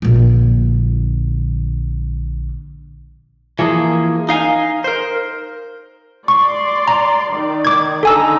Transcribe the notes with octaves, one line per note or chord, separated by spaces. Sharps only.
A#1 D3
E3 F3 A#3 G#4
D#4 F5 G#5
A#4 C5
D5 C6 C#6
A#5
D#3 D5
D6 G#6
D3 D#4 A4 G#5 A#5 E6